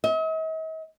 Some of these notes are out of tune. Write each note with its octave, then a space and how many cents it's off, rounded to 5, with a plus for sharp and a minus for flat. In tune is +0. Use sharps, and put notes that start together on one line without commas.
D#5 +45